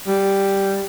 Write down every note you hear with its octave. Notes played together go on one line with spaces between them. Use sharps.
G3